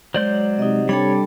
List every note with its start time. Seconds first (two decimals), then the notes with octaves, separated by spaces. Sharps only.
0.14 F#3 G#3 C5 D5 G6
0.59 C3 D#4 D#5
0.89 G3 D4 A4 C#5 G5 B5